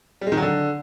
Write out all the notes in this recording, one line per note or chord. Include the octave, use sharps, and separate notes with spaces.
G3
G#3
D#3
F#3
D3